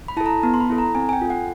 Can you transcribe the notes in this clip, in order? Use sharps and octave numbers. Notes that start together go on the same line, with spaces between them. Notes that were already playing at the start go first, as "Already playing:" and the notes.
B5
E4 A4 A5
A#5
B3 A5
C6
B5
E4 A4
A#5
C4 G#5
G#5
G5
F4 A4
F#5